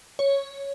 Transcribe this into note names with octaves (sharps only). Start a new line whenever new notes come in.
C#5